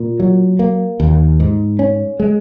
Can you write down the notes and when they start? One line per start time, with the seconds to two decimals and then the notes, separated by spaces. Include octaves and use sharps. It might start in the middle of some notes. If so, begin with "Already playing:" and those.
Already playing: A#2
0.20 F#3
0.59 A#3
1.00 D#2
1.40 G#2
1.79 C#4
2.20 G#3